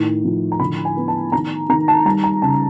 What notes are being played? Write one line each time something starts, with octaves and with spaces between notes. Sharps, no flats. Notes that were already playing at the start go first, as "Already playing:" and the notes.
Already playing: A2 D#3
F3
A#5
D3 B5
G#5
B3
A5
D#3 A#5
D#3 A#5
A5
G3 A#5
A#5
C#3 A5